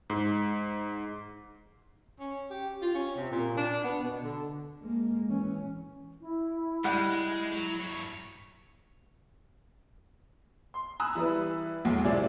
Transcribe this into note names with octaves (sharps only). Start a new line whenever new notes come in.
G#2
C#4
G4
F4
C#4
C3
A#2
D4
B3
B2
D3
G#3 A#3
E3 C#4
E4
G3 G#3 F#5
F#3
G2 C#5
C6
G#5 A#5 B5 D#6 E6 F#6
E3 G3 E4 B4
B1 E2 F#3 G#3
F#1 C3 E4 F4 G#4 D5